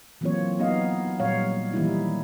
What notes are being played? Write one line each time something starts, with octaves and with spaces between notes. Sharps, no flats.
E3 F#3 A#3 C4 F4 C#5
F#3 B3 D#4 D#5 F5
A#2 F#3 G3 C#5 F5
D#3 E3 G3 A#3 D#4 E4